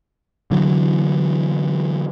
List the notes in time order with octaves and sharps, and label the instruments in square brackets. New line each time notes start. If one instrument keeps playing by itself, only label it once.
[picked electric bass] D3 E3 F#3